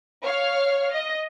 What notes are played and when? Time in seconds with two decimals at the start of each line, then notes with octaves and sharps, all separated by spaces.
0.23 C#5 F5 F6
0.93 D#5